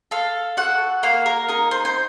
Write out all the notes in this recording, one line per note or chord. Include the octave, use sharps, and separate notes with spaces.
A4 F5
F#4 F#5
A#3 F5
A#4
D#4 A#4
C5
C5